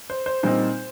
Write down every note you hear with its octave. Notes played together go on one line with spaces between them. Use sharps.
C5
C5
A#2 G3 C4 D#4 C5